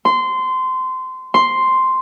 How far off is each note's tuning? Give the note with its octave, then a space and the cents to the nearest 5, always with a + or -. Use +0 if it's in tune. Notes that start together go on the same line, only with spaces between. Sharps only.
C6 -20
C6 +0